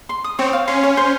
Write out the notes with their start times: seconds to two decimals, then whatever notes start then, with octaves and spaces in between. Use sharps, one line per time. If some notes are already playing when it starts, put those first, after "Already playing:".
0.09 C6
0.24 D#6
0.39 C4 C#5
0.53 F5
0.67 C#4 C6
0.83 C#5
0.97 C5